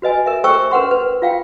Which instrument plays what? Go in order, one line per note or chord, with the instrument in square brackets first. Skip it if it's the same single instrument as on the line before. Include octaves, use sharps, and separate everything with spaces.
[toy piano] F#4 B4 D#5 G#5
A#4 E5
A4 C5 G5 C#6 E6
C#4 A#4 B4 F#5 C6
B4
F4 F5 G5